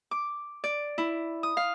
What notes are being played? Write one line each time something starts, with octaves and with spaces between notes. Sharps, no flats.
D6
D5
E4
D#6
F5